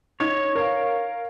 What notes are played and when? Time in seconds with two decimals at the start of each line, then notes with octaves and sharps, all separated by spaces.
0.20 D#4 C#5 G#6 F7
0.56 A#4 F5